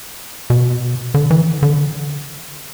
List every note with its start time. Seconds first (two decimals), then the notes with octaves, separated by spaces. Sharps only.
0.50 B2
1.14 D3
1.31 E3
1.63 D3